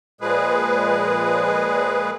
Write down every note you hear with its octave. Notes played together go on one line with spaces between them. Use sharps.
A#2 F3 G#3 G#4 B4